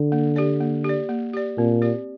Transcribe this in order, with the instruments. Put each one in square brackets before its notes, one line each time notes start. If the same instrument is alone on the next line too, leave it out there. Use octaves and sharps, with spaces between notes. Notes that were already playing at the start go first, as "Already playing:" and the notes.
Already playing: [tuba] D3
[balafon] A#3
G4 D5
A#3
G4 D5
A#3
G4 D5
[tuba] A#2 [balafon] C4
[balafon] G4 D5